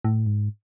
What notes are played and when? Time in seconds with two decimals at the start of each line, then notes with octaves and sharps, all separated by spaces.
0.05 A2
0.26 G#2